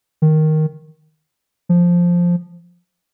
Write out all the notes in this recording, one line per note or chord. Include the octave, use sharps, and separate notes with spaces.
D#3
F3